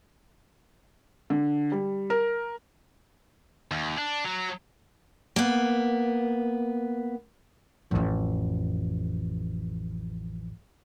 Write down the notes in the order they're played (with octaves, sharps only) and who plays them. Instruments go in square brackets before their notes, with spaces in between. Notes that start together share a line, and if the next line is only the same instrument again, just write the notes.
[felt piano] D3
G3
A#4
[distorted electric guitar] D#2
D4
F#3
[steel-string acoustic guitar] A#3 B3
[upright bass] A1 F2